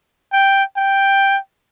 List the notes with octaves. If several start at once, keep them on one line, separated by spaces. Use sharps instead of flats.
G5
G5